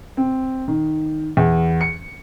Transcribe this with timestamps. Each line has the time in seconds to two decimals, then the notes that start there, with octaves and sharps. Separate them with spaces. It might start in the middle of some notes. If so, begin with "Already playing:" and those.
0.17 C4
0.68 D#3
1.37 E2
1.81 C#7